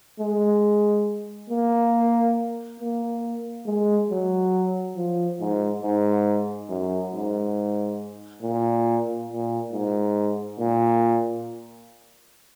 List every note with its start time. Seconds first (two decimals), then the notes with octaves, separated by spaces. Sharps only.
0.20 G#3
1.50 A#3
2.80 A#3
3.66 G#3
4.10 F#3
4.97 F3
5.40 G#2
5.83 G#2
6.69 F#2
7.13 G#2
8.42 A#2
9.30 A#2
9.72 G#2
10.60 A#2